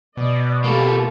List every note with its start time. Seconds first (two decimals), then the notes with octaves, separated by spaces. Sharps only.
0.17 B2 D5 D#5
0.64 A#3 F4 G4 A4